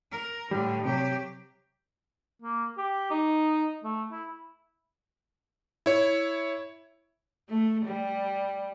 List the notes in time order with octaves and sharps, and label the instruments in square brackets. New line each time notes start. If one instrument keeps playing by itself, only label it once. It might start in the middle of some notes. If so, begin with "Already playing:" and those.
[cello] A#4
[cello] A2 D3 [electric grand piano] G3
[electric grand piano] C3 [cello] F#3 G4
[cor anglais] A#3
G4
D#4
A3
E4
[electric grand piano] E4 C#5
[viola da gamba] A3
G3